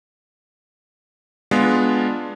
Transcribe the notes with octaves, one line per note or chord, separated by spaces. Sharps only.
G#3 B3 D4 F4